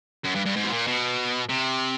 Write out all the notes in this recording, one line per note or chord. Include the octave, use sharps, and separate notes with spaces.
F#2
G2
G2
G#2
B2
A#2
B2
C3